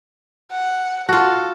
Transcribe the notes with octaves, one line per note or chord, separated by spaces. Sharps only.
F#5
F4 F#4 A4